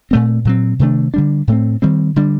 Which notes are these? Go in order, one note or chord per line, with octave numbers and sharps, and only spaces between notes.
A#2 A3 C4
A#2 F#3 C4
C3 D#3 A3 D4
D3 G3 D4
A2 A3 C4
D#3 G3 C4
D3 G3 D4